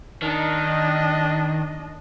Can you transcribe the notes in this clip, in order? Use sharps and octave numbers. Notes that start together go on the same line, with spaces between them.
D#3 D4 D#5